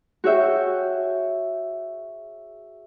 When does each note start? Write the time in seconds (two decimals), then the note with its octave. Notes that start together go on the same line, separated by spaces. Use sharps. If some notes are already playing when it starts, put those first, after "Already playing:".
0.24 F#4 G#4 C#5 E5 G5